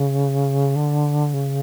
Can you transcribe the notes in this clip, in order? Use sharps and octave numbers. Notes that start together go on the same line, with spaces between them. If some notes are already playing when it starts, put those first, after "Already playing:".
Already playing: C#3
D3
C#3